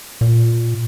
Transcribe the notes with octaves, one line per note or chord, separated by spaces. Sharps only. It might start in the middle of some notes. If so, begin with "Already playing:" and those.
A#2